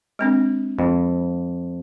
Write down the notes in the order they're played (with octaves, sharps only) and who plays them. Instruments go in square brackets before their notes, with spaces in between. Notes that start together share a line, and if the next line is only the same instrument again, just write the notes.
[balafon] G#3 C4 D4
[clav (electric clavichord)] F2